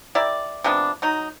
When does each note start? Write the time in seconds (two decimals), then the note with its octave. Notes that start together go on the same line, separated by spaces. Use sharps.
0.15 E4 G4 A#4 D5
0.64 C3 F3 B3 D4
1.02 F#3 D#4